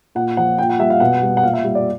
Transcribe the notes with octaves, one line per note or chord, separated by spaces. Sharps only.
A#2 F#5
F3 F#5
A#2 G5
F#5
G3 E5
F5
B2 F#5
G3
F#5
A#2 F5
E5
G3
D5